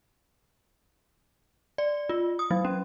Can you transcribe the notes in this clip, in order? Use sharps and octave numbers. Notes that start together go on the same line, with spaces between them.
D5
F4
D#6
F#3
C#4